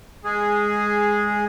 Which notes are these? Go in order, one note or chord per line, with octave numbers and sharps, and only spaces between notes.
G#3 G#4